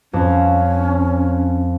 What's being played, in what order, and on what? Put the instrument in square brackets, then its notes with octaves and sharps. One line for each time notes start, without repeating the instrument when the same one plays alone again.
[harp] F2 [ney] C#4